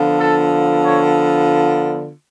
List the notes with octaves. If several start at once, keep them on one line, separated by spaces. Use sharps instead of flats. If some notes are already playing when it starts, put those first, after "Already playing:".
Already playing: D3 F3 B3 F4
A4
C#5